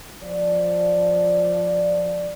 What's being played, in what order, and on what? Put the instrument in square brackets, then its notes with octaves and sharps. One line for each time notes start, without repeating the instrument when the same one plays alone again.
[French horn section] F3 D5